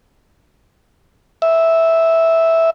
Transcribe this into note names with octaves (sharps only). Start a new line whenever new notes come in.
E5